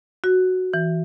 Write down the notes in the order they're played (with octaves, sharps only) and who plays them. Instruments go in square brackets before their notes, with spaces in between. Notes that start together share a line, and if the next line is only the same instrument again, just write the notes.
[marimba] F#4
E3